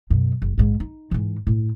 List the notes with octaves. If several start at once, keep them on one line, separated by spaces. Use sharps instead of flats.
F#2 B2
F#1
A#1 G#2
D#4
G#2 E3
A2